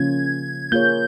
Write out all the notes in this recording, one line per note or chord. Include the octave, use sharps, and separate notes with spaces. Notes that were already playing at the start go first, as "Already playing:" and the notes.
Already playing: C#3 F3 A#3 C#4 F4 G#6
A#3 F4 G#4 C#5 G6